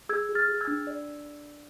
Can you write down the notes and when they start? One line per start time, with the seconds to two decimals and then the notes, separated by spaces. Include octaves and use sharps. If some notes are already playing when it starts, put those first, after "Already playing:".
0.09 G#4 E6 G#6
0.29 G#4
0.35 F6 A6
0.48 G#4
0.61 E6 G#6
0.67 D4
0.87 D5